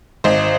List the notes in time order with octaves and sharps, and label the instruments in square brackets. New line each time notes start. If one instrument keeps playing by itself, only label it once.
[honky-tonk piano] G#1 C5 D#5